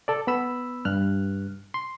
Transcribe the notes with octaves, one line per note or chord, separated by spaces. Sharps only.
A4 D5
B3 B5 E6
G2 F6 F#6
C6